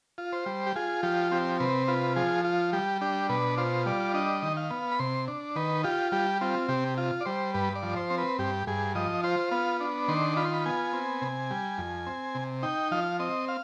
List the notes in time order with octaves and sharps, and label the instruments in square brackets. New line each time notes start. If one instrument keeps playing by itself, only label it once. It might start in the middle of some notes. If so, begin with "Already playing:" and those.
[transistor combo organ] F4
C5
G3
G4
F4 G#4
F3 G4
C4 G4
C3 B4
F4 B4
F3 G#4
F4
G3 G4
D4 G4
B2 B4
F4 C5
G3 D5
D4 D#5
D#3
F5
B3
B5
C3 C6
D4
D#3 B4
F4 G4
G3 G4
C4 F4
C3 G4
F4
D5
G3 C5
G2 B4
D5
F3
C5
C4
B4
G2 G4
G2 G#4
F3 D#5
F4 C5
B3 F5
D4
D#3 C6
F4 B5
C6
B5
B3 G#5
C4
C3
G3
F2
C4
C3
D#4 G5
F3 F5
C4 D#5
F5